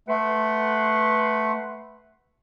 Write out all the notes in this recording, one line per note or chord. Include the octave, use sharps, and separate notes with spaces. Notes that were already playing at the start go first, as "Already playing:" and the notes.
A3 B4 F#5 C6